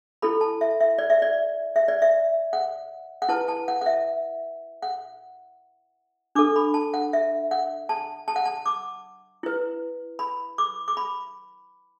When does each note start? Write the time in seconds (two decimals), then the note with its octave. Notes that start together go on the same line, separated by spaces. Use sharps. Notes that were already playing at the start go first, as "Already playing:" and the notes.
0.22 E4 A4 B5
0.41 A5
0.61 E5
0.80 E5
0.98 D5
1.10 E5
1.22 D5
1.76 E5
1.88 D5
2.02 E5
2.53 F#5
3.22 F#5
3.29 E4 B4 A5
3.48 A5
3.68 F#5
3.81 F#5
3.86 E5
4.82 F#5
6.35 D4 A4 D6
6.56 B5
6.74 A5
6.94 F#5
7.13 E5
7.51 F#5
7.89 A5
8.28 A5
8.36 F#5
8.45 A5
8.66 D6
9.43 E4 B4
10.19 B5
10.58 D6
10.88 D6
10.97 B5